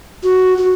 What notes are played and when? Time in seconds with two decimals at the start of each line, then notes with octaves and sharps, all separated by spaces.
0.23 F#4
0.58 F#4